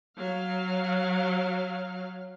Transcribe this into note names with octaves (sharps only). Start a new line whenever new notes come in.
F#3 F5